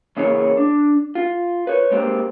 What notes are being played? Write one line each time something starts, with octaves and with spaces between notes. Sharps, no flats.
C#3 E3 A#3 E4 G#4 C#5
D4
F4
B4 C#5
G#3 A#3 C4 G4